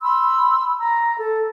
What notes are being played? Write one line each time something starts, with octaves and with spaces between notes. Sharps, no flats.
B5 C6 E6
A#5
A4